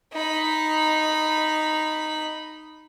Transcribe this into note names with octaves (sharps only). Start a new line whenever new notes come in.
D#4 B5